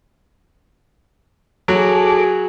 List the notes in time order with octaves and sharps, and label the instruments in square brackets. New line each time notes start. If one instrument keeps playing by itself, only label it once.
[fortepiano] F#3 [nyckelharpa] F#4 G#4 [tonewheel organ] A4 D6